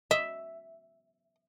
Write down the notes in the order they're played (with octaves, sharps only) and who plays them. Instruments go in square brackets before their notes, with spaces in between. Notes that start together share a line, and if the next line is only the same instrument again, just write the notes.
[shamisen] D#5 [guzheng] E5